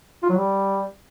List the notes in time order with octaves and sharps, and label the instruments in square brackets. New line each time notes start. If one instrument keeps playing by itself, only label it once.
[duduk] F4
F#3
G3